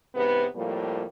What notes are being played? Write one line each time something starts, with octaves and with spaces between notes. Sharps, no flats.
E2 G#2 C3 B3
F2 A2 F3 G3 A#3